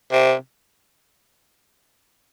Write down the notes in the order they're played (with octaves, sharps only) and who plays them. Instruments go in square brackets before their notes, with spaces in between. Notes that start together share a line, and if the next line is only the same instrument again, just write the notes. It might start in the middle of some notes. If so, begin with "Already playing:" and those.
[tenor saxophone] C3